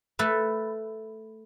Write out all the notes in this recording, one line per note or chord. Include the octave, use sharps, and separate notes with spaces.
A3 A4 B4